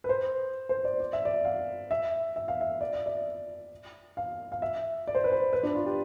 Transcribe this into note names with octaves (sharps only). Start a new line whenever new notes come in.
B4
C5
C5
D5
D5
E5
D5
F5
E5
E5
F5
E5
D5
E5
D5
F5
F5
E5
D5
C5
B4
C5
B4
D4
F4
G4